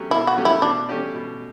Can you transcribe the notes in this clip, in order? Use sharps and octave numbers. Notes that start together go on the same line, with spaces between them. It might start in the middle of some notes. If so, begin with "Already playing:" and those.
Already playing: B2 F#3 A3 C#4 G4
B2 E4
F#4
F#3 A3 C#4 G4
E4
B2 D4
A3 C#4 G4 D5
B2